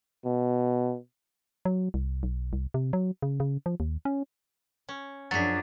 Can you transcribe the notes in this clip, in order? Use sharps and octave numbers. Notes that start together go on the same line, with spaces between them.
B2
F#3
C2
B1
C2
C3
F#3
C#3
C#3
F3
D#2
C#4
C#4
F#2 F3 F#3 D4 G#4 A6 B6